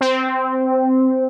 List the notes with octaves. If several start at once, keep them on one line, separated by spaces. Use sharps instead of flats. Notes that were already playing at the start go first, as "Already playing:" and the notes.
C4